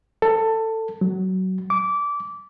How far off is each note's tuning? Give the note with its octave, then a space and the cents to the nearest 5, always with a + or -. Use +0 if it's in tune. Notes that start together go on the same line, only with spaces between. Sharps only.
A4 +15
F#3 +20
D6 -20